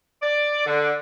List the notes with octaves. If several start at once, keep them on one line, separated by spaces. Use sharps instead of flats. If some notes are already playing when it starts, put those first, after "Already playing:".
D5
D3